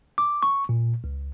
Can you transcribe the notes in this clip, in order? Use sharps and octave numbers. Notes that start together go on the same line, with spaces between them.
D6
C#6
A#2
C#2